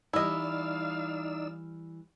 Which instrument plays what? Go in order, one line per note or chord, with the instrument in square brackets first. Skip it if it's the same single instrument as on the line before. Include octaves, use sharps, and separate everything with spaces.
[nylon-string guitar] E3 G3 [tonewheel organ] D#4 D5 E6 [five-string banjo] E4 D#5 [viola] F5